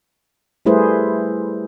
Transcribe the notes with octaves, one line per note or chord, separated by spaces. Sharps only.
G3 A3 E4 G#4 B4 C5